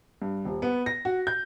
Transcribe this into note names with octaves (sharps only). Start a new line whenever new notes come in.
G2
D#1
B3
A#6
F#4
G6